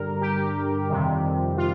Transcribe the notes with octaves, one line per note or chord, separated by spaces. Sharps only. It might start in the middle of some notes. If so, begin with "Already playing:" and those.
Already playing: G2 D3 G3 A#4
G4
F2 C3 D#3 G3
F4